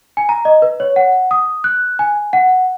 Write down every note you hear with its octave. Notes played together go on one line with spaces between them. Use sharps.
G#5
A#5
D#5
B4
C#5
F#5
D#6
F#6
G#5
F#5